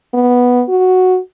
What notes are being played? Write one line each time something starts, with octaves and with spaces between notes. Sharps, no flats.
B3
F#4